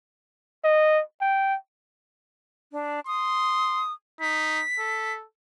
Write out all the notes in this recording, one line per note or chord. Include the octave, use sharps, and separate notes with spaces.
D#5
G5
D4
C6 D#6
D#4 B6
A4